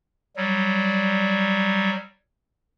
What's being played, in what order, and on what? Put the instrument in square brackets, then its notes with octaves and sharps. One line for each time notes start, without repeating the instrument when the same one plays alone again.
[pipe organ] F#3 G3